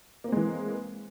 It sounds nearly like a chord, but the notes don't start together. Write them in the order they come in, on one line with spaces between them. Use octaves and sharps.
A#3 C4 G#3 E3